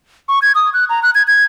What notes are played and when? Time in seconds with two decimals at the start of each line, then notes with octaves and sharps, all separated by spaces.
0.29 C#6
0.42 G#6
0.55 D#6
0.74 F#6
0.89 A#5
1.03 F#6
1.15 G#6
1.27 G#6